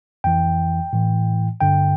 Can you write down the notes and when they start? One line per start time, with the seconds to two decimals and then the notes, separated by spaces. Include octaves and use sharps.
0.24 F2 E3 G5
0.93 A2 E3
1.60 G2 D3 G5